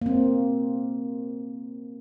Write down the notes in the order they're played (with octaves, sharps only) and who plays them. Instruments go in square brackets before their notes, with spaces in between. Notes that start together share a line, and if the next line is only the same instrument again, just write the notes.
[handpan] A#3 C4